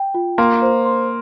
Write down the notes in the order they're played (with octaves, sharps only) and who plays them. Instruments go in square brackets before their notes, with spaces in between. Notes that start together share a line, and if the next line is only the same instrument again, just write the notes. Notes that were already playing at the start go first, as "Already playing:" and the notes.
Already playing: [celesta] G5
F4
[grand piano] A#3 [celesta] C6
[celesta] C5
C6